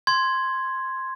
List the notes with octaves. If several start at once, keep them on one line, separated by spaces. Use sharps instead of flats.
C6 G#6